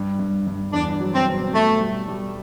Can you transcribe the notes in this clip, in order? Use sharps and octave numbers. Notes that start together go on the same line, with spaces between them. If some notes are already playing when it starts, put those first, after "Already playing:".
Already playing: G2
G2
G2
E2 D4
F#3
C4
B2
B2 A3
G3
G3